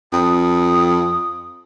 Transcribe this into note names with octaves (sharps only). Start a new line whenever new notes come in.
F2 D#6